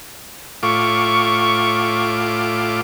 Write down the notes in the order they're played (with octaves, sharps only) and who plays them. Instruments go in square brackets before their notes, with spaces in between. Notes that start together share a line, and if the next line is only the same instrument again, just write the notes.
[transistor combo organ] A2 F4 D6 [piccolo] C#6